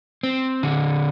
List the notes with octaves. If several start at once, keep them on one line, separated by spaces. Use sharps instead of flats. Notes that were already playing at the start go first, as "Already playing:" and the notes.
C4
D3